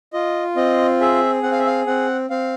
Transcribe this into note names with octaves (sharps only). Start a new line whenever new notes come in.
F4 D#5
C4 D#5
G#4 E5
C4 F#5
F5
E5
F5
C4 F#5
C4 F5